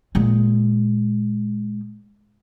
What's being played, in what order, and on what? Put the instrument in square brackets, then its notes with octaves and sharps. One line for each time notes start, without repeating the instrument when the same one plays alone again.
[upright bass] A#2 G#3